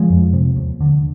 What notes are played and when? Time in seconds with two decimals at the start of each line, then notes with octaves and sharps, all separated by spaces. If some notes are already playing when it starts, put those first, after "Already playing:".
Already playing: F3 G#3
0.10 F2
0.33 C3
0.56 D#2
0.81 D3